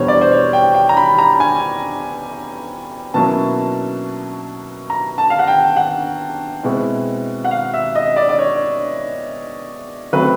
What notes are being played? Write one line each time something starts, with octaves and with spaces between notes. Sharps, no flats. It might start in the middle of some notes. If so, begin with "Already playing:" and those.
Already playing: E2 B2 G3 B3 D4 C5 C#5
D5
C5
C#5
G5
G5
A#5
B5
A#5
G#5
B2 F#3 A#3 C#4 E4 A5
A#5
A5
F5
F#5
G5
F#5
B2 G#3 C4 E4
F#5
F5
E5
D#5
D5
D5
C#5
C#3 F#3 A3 C4 B4